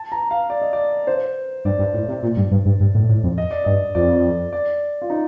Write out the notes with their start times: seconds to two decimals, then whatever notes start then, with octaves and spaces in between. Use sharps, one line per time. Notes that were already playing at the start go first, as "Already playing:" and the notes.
Already playing: A5
0.12 A#5
0.31 F5
0.50 D5
0.61 D#5
0.73 D5
1.07 C5
1.65 G2 D5
1.79 G2
1.94 A2
2.08 C3
2.23 A#2
2.37 G2
2.51 G2
2.66 G2
2.80 G2
2.94 A2
3.09 A2
3.23 F2
3.38 D#5
3.51 D5
3.65 G2 D#5
3.95 F2 D5
4.53 D5
5.02 F4
5.10 D#4